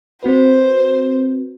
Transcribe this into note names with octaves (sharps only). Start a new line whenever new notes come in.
C4 F#4 B4 C5